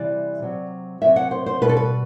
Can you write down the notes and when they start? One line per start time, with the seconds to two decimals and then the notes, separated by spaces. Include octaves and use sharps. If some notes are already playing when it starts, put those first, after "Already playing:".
Already playing: C3 E3 G3 D5
0.42 C3 F#3
1.01 C3 F#3 E5
1.16 F#5
1.31 C5
1.46 C5
1.61 B2 G3 B4
1.69 A4
1.77 B4